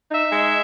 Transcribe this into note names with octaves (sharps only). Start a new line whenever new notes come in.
D#4 E5
G#3